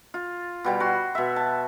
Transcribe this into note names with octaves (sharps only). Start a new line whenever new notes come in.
F4
B2 G3 G5
F#4 C6
B2 E5
A5